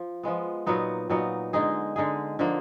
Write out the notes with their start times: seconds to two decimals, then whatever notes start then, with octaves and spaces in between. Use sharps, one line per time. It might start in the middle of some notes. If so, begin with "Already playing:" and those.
Already playing: F3
0.23 F3 G#3 B3
0.66 A#2 F#3 B3 D#4
1.10 A#2 F#3 B3 D#4
1.53 D3 G#3 D#4 G#4
1.96 D3 G#3 D#4 G#4
2.39 D3 F3 A#3 D#4